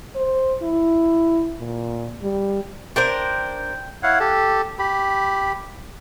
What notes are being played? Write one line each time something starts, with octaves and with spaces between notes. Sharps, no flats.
C5
E4
A#2
G3
D4 A#4 C5 G5
E4 C#5 F5 F#5
G4 A4
G4 B5